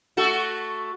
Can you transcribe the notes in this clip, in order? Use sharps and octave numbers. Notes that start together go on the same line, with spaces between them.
A3 F#4 A4